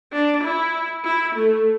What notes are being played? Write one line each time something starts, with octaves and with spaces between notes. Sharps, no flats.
D4
E4
E4
A3